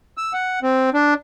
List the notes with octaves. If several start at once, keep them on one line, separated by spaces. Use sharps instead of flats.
E6
F#5
C4
D4